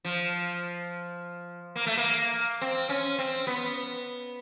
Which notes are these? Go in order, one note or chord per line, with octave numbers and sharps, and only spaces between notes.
F3
A#3
A3
A#3
C4
C#4
C4
B3